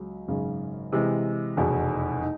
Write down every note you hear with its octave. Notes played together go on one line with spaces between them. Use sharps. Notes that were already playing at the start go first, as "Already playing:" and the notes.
Already playing: C#2 F#3
G#1 F#2 C#3
C3 E3 G#3
F1 E2 B2
D#4